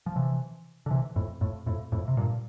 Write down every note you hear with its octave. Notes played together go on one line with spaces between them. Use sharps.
F3
C3 E3
D3
C3 E3
F2 A2
F2 A2
F2 A2
F2 A2
C3
G2 A#2